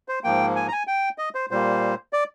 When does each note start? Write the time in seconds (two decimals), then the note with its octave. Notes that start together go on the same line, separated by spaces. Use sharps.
0.08 C5
0.24 G#2 F3 A#3 G5
0.56 G#5
0.68 A#5
0.72 G#5
0.87 G5
1.18 D#5
1.35 C5
1.51 A#2 G3 A#3 C5
2.13 D5